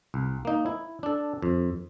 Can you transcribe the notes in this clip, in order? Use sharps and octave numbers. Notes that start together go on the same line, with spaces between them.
C2
A#3 D#4
E4
D4 A4
F2